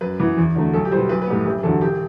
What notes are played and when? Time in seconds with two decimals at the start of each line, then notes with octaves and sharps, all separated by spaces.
0.01 F#2 B4
0.20 E3 B3
0.37 E2
0.55 D3 F#3 A3
0.73 B1 A4
0.85 G4
0.91 G3 C5
0.95 B2 B4
1.09 B1 B4
1.22 B4
1.27 A2 G3 B3
1.45 F#1 G4
1.63 E2 D3 F#3 A4
1.81 E1 G4